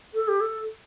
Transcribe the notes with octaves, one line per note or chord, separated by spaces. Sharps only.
A4
G4
A4